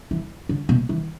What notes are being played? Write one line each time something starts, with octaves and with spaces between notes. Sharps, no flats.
E3
D3
B2
E3